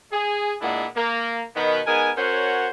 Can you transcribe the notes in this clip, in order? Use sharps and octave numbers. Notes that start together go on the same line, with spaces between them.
G#4
A#2 G#3 A#3 B3 D4 E4
A#3
B2 D#3 B3
G#3 B3 D#4 A#4 G#5
C#4 F#4 A#4 C5 C#5 F#5